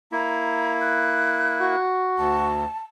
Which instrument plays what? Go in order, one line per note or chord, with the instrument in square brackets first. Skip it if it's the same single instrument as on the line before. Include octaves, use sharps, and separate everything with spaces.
[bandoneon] A#3 E4 [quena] A#5
[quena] F#6
[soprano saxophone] F#4
[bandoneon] D2 [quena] A5